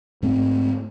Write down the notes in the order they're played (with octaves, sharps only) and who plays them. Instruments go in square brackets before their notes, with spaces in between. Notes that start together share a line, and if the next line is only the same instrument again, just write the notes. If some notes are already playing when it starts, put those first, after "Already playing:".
[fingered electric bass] G#2 A3 C4